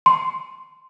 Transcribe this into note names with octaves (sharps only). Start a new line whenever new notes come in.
C6